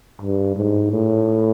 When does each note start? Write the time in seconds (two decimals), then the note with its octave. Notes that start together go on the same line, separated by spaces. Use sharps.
0.21 G2
0.56 G#2
0.91 A2